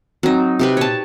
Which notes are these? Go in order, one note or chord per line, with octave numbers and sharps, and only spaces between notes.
F#3 C4 D#4
C3 G4 B4
A#2 C#5 A5